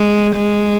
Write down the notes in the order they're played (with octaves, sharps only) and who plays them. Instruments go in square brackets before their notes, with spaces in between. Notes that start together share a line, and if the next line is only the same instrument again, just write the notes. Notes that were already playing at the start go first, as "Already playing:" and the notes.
Already playing: [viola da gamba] G#3
G#3